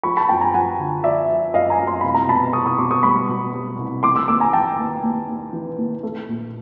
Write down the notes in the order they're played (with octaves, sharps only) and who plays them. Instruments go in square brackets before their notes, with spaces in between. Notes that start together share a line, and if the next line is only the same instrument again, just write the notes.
[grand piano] F3 B5 C#6
A5 B5
F#2 G5 A5
G#5 A#5
F3 F#5 G#5
D3
F3 D5 E5
F3
F#2 D#5 F5
G#5 A#5
F#2
C6
C2 B5
A#5
B2 A5 B5
C2 C#6 D#6
C#6 D#6
B2 C6 D6
C#6 D#6
G3 B5 C#6
B2
G3
C2
E3 C6 D6
D6 E6
D#2 D6 E6
G#5 A#5
E3 G5 A5
D#2
D#2
D#2
E3
D#2
A3
A#1